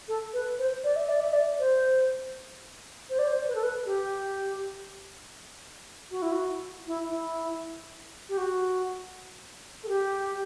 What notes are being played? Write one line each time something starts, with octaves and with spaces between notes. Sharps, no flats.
A4
B4
C5
D5
E5
D5
E5
D5
C5
C5
D5
C5
B4
A4
B4
G4
F#4
E4
F#4
E4
E4
G4
F#4
A4
G4